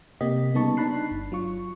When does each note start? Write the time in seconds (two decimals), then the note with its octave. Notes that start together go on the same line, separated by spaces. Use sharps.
0.21 C3 A#3 G4 D#5 B6
0.54 C#3 G3 B3 D#4 A5 C#6
0.77 D4 D#4 A5 B5 F#6 C7
1.11 G1
1.32 F#3 F4 C#6